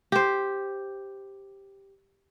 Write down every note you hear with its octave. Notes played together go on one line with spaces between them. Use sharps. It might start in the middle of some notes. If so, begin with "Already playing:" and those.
G4 C5